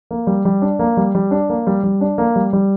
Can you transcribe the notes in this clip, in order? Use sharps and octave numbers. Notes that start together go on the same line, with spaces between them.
A#3
G3
G3
D4
A#3
G3
G3
D4
A#3
G3
G3
D4
A#3
G3
G3